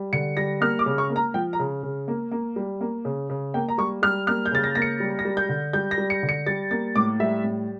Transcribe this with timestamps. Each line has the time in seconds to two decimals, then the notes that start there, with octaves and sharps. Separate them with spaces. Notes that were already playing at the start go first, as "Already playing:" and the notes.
Already playing: G3
0.13 D3 C#7
0.37 G3 A#6
0.61 A#3 F6
0.79 D6
0.86 C#3
0.98 C#6
1.10 A#3
1.16 A#5
1.34 F3 G5
1.53 A#5
1.59 C#3
1.83 C#3
2.08 A#3
2.31 A#3
2.56 G3
2.81 A#3
3.05 C#3
3.30 C#3
3.54 A#3 G5
3.68 A#5
3.78 G3 C#6
4.02 G3 F6
4.27 A#3 F6
4.46 G6
4.52 C#3 A6
4.64 A#6
4.75 A#3 A#6
4.82 C#7
5.00 G3
5.19 A#6
5.25 G3
5.37 G6
5.49 D3
5.73 G3 G6
5.91 A#6
5.98 G3
6.10 C#7
6.23 D3
6.29 C#7
6.46 G3 A6
6.71 A#3 A6
6.96 A2 D6
7.20 G3 E5
7.44 A2